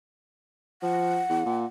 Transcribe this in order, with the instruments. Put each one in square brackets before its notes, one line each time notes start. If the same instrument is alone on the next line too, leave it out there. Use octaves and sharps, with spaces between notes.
[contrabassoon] F3 [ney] F#5
[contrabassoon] E2
A#2